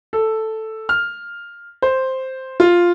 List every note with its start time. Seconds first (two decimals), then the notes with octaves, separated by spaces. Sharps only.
0.13 A4
0.89 F6
1.82 C5
2.60 F4